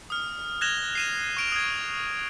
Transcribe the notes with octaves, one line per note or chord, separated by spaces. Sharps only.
D#6 F6
F#6 G#6 A#6 E7 F7 G7
C7 D#7 E7
C#6 D7 F7
D#6 G#6